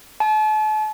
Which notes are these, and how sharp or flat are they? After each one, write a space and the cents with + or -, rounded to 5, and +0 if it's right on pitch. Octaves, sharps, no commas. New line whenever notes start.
A5 -40